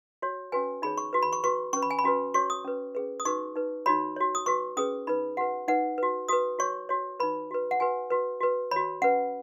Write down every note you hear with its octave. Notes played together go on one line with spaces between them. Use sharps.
F#4 C#5
C#4 F#4 B4 G#5
D#4 G#4 C#5 B5
C#6
F#4 B4
B5
C#6
F#4 B4 C#6
C#4 B4 C#6
B5
G#5
B5
C#4 F#4 B4
F#4 C#5 C#6
D#6
C#4 B4
C#4 G#4 B4
D#6
D#4 F#4 B4 C#6
D#4 B4
D#4 F#4 C#5 B5
F#4 C#5
D#6
F#4 B4 C#6
C#4 G#4 B4 D#6
D#4 B4 B5
F#4 B4 F#5
D#4 B4 F#5
F#4 B4
F#4 B4 D#6
F#4 C#5 C#6
F#4 C#5
D#4 B4 B5
F#4 B4
F#5
F#4 B4 G#5
F#4 B4
F#4 B4
F#4 C#5 B5
C#4 B4 F#5